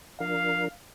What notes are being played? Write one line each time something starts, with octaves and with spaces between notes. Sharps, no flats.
F3 D4 A#4 F5